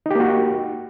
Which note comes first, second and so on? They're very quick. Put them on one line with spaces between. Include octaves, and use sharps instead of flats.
D#4 G4 A#3 F#4